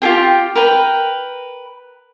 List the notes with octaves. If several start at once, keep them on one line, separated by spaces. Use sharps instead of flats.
F4 G4 G#4 G5
A#4 B4 G5